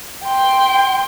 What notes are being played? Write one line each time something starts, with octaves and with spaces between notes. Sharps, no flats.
G5 C6